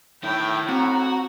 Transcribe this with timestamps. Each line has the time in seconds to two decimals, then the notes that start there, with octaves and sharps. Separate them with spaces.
0.23 A2 D#3 E4 G5
0.69 C4 F#4 A#5